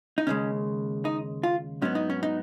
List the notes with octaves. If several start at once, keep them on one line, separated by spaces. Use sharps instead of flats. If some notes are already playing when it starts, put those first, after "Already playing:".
D#4
D#2 C#3 G#3 C#4
D#4
F4
G#2 F#3 B3 C#4
D#4
C#4
D#4